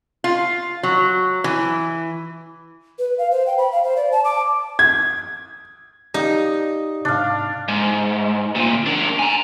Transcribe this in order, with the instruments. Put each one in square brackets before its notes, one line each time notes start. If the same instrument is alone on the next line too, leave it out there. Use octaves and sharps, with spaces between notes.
[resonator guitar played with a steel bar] F4
F#3
E3
[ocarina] B4
F5
C5
G5
B5
F5
C5
D5
A5
D6
[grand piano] G#6
[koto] D#4 [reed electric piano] G4 D5 F5
[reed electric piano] G#2 C3 [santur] D4 F5
[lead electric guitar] G#2
D2 A#2
D4 A#4
G#5 A#5